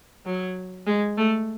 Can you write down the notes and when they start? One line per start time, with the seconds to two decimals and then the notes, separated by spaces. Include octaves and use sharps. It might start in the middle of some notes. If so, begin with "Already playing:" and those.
0.25 F#3
0.87 G#3
1.17 A3